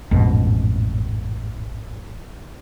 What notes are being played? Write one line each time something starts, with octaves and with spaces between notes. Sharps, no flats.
A1 F2 G#2 B2